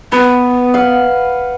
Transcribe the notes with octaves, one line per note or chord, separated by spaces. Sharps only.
B3 B4
F5 F#5